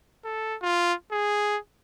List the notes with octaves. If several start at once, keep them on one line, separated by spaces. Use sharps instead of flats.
A4
F4
G#4